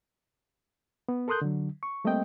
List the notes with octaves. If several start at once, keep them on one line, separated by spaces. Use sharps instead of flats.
B3
A4 A#4 C6 D#6 F#6 G6
D3 F#3
C#6
G3 A3 A#3 C4 D#5 G5